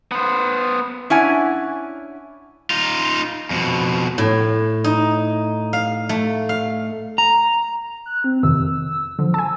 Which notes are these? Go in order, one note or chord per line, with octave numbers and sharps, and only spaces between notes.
B3 C5
C#4 D4 E4 F#5 G#5
D#4 F4
F2 B2
A2
D#4
F5
A3
F5
A#5
F#6
C4
F2 C3 D#3 E6
D3 F3
G#5 A5 E6